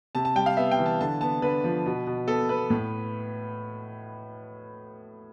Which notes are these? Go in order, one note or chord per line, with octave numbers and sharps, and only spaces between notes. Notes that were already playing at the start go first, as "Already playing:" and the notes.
C3 A5
A5
G3 G5
F5
B3 E5
G5
E3
A5
D3 A5
B3 A5
D3 B4
F3
B2
B2
B3 A4
B3 B4
A2